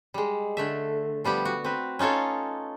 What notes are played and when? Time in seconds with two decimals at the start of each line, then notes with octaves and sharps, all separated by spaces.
0.14 G3 G#3
0.57 D3 A3 E5
1.24 F3 G3 B3 G4
1.45 F#4
1.64 C4 B4
1.99 C#4 D#4 F4 A4 C#5